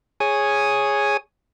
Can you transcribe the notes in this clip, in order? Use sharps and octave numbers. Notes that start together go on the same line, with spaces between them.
G#4 C#5 G#5 D#6